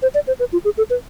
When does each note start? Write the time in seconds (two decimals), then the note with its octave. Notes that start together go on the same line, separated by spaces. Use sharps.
0.02 C5
0.15 D5
0.27 C5
0.39 B4
0.53 F4
0.65 G#4
0.78 A4
0.90 B4